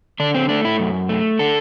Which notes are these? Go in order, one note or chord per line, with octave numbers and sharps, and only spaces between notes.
D3 D4
C4
A3 D4
E4
F#2
A3
D3 A4